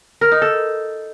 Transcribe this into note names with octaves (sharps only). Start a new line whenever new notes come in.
A#4
D#4
A4